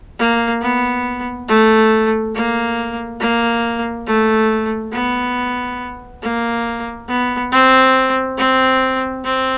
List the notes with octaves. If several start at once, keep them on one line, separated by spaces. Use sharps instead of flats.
A#3
B3
A3
A#3
A#3
A3
B3
A#3
B3
C4
C4
C4